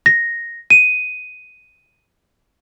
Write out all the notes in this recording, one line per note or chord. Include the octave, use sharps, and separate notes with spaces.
A#6
D#7